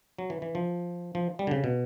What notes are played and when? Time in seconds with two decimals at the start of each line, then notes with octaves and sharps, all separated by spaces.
0.18 F#3
0.30 E3
0.42 E3
0.55 F3
1.15 F3
1.39 G3
1.47 D3
1.51 C#3
1.64 B2